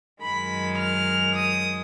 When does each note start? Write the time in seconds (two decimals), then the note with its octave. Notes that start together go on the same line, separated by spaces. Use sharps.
0.22 F#2 D#3 G#3 B5
0.78 F6
1.35 D#6